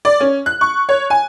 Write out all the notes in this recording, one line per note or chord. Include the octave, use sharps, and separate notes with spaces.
D5
C#4
F#6
C#6
C#5
G#5